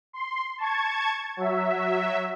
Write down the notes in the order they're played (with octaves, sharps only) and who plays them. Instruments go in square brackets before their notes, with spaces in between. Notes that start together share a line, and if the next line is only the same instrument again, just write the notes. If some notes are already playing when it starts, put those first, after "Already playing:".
[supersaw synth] C6
A5 C#6 G#6
F#3 E5